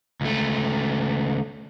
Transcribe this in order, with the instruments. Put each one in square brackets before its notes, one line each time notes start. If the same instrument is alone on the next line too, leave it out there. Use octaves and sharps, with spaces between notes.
[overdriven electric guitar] C#2 A3